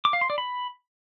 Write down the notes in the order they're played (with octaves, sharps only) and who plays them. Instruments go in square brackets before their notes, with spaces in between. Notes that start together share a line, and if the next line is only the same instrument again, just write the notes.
[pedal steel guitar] D6
F5
C6
D5
B5